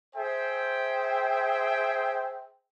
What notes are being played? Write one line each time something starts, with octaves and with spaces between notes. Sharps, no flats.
G#4 C5 E5 G5